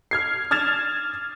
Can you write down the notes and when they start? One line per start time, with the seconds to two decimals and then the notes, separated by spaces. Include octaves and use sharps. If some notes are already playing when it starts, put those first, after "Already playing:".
0.11 F6 G#6 C7
0.51 D#6 F6 G#6 A6 E7 F7